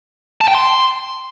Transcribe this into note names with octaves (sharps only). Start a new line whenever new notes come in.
A5
G5
C6